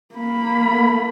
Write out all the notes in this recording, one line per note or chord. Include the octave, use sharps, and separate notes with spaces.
A#3 B5